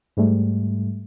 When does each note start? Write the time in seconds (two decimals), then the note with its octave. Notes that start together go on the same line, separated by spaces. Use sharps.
0.17 G#2 G3 A3